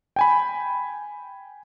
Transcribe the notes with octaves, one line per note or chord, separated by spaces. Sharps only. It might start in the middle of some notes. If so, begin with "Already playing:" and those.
G5 G#5 B5